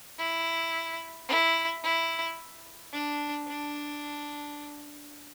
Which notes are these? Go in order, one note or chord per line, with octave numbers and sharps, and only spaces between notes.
E4
E4
E4
D4
D4